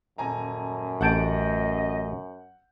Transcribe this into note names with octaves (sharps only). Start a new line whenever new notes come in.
D#1 F#2 G#5 A#5
A1 D#5 F#5 A5 G6 D7